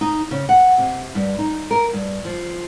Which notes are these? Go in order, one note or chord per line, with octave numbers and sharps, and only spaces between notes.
D#4
C#3
F#5
C3
G2
D#4
A#4
G2
F3